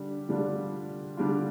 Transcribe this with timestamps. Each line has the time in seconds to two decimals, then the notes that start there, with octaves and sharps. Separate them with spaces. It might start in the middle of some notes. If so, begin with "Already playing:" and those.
Already playing: D3 G3 D4
0.29 D3 G3 D4 F4
1.17 D3 G3 D4 F4